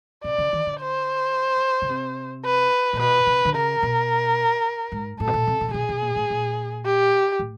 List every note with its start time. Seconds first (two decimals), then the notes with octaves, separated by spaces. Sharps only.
0.24 C3 D5
0.38 C#3
0.53 D#3
0.67 D3
0.80 C5
1.82 C#3
1.89 C3
2.45 B4
2.93 A#2
2.99 B2 B4
3.27 C3
3.45 D3
3.54 C#3 A#4
3.83 B2
4.92 G#2
5.20 A2 A4
5.27 B2
5.34 A#2
5.47 C3
5.61 B2
5.68 C3
5.74 B2 G#4
5.89 B2
6.02 A#2
6.16 A2
6.30 A#2
6.85 G4
7.39 A2